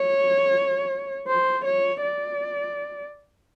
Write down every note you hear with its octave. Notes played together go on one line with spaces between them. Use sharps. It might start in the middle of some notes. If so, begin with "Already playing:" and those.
Already playing: C#5
C5
C#5
D5